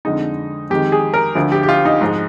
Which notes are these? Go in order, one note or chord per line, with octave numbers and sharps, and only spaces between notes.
F2 D3 G#3 D#4
F2 D#3 G#3 G4
G#4
A#4
D2 D3 F3
G4
G4
F4
D#4
G#2 F3 G#3